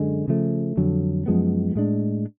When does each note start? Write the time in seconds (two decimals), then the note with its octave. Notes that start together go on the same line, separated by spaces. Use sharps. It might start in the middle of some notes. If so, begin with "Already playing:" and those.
Already playing: F#2 D3 G#3
0.28 C#3 F3 A3
0.77 F2 D3 F#3
1.26 F#2 F3 G#3 B3
1.75 A2 G#3 D4